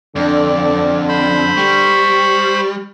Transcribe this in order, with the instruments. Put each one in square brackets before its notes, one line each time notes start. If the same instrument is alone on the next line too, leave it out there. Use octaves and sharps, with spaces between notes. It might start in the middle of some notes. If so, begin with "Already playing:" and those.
[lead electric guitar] F2 [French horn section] D3 [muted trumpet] D5
[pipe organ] C5 B5
[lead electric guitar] G3 [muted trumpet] C#6